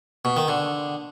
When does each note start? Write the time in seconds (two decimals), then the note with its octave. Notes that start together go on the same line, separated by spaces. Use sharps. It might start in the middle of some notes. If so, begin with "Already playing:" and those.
0.25 B2
0.37 D#3
0.48 D3